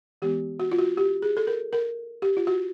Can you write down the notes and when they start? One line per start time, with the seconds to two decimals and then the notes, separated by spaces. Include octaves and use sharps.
0.22 E3 G#3 B3 G4
0.60 F#4
0.72 F4
0.78 F#4
0.97 G4
1.22 G#4
1.37 A4
1.47 A#4
1.73 A#4
2.22 G4
2.37 F4
2.47 F#4